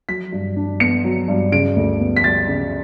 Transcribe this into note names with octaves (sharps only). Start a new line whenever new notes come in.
F#3 B6
G2
D4
B3 C#7
F#3
G2
C#3 D7
D2
B3
B6
G3 A6
C#3